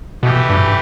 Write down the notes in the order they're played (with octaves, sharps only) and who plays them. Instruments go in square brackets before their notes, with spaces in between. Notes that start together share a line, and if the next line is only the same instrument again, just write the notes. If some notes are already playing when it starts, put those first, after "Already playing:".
[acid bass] B2 [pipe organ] E3 A3 G4
[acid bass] G2